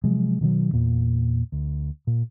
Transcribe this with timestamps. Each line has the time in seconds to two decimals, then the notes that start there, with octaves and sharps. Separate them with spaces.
0.04 C3 F3 F#3 G#3
0.41 B2 D#3 E3 F#3
0.73 E2 A#2 A#3
1.52 D2
2.07 A#2